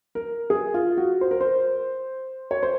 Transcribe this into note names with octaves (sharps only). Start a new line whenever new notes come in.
A#4
G#4
F4
F#4
C5
A#4
C5
C#5
C5